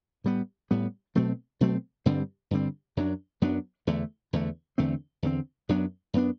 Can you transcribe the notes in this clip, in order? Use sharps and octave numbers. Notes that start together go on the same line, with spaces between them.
A2 G3 B3
A2 G3 B3
B2 F#3 A3 C4
B2 F#3 A3 C4
G2 D3 G3 C4
G2 D3 G3 C4
F#2 F#3 B3 D4
F#2 F#3 B3 D4
E2 D3 A3
E2 D3 A3
E2 D3 A3 C4
E2 D3 A3 C4
F#2 F#3 B3 D4
F#2 F#3 B3 D4